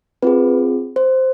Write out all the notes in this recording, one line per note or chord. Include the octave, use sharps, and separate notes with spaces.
C4 F4 G#4 B4
C5